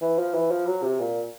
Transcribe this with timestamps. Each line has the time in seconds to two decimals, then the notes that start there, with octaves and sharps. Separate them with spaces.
0.01 E3
0.19 F3
0.34 E3
0.51 F3
0.67 F#3
0.83 C3
1.00 A#2